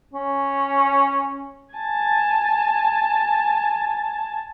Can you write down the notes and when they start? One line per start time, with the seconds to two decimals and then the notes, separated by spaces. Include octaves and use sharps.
0.14 C#4
1.74 G#5 A5